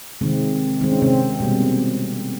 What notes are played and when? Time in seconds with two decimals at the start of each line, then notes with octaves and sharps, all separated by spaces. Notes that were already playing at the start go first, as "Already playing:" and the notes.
0.21 C3 D#3 G#3 C4
0.81 D#3 G#3 C4
0.91 C#4
1.02 C3 C4
1.40 B2 G3 A#3